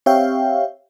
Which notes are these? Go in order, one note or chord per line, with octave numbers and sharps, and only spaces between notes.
C4 G4 C#5 E5 F5 G5